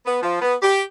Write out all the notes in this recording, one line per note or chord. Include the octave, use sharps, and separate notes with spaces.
B3
F3
B3
G4